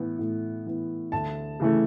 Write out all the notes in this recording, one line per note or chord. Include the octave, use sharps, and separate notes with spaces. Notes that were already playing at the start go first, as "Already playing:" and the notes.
Already playing: A2 E3 B3
A2
E3 B3
D2 A5
C#3 E3 A3